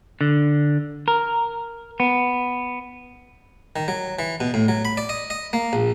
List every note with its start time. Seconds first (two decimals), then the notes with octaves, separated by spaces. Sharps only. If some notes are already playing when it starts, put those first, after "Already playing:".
0.21 D3
1.08 A#4
2.00 B3
3.76 D#3
3.88 F#3
4.19 E3
4.40 B2
4.54 A2
4.68 F#3
4.85 B5
4.97 D5
5.09 D#5
5.30 D#5
5.53 A#3
5.73 A#1